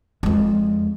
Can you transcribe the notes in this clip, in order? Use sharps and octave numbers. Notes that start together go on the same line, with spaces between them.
F2 G#3